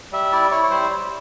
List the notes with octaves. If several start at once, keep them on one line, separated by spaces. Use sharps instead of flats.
G3 E5
E4 D5
E4 C#5
C#5
G3 C5
G3